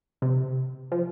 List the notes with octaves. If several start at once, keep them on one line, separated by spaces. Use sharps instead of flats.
C3
F3